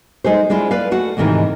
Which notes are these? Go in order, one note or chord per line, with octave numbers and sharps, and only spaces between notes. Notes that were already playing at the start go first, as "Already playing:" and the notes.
G#3 D#4 G#4 C5
G#3 D4 E4 F4
B4 D5 F5
A3 F#4 F#5
D2 G#2 C3 D#3 E3